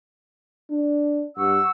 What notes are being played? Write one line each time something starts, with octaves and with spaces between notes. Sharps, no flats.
D4
G2 F#5 C#6 E6